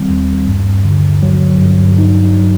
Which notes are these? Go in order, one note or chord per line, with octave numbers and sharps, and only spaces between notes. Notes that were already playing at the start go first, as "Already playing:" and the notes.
Already playing: D#3 G3 C4
D#2
G2
D3
F#3
G2
D#4
F#3